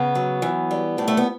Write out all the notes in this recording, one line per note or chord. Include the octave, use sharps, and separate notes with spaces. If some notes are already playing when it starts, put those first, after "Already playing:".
Already playing: C#3 B3
F#3
E3
G3
A2
A3
B3